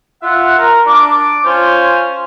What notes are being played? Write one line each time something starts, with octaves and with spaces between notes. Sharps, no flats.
F4 E5 F#5
A#4
D4 D6
C#4 F4 C5